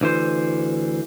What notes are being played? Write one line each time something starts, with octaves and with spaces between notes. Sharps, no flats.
D2 E3 C5